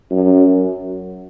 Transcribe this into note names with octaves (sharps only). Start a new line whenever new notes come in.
F#2